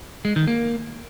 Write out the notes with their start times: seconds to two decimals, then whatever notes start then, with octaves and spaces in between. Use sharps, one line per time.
0.25 G#3
0.36 D#3
0.48 A#3